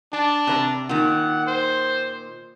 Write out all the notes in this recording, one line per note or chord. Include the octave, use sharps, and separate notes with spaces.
D4 A5
C3 C5 A#5
A#2 D#3 F#5
C5